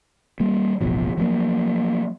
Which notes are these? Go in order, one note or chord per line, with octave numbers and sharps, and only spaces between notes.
G3 A#3
D1 A1 B2 F3
F3 F#3 A#3